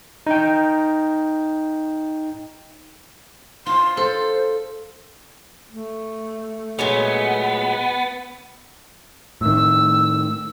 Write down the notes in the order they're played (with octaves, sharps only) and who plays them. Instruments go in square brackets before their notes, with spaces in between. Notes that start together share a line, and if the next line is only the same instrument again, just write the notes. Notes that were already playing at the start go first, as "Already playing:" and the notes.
[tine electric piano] D#4 G5
[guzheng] F4 [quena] C6
[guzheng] A4 [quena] C5
[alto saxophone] A3
[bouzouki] A#2 F#3 G#3 [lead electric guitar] B3
[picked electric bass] A2 D#3 [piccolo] E6